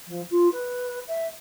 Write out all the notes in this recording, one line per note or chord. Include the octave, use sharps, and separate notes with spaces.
F3
F4
B4
E5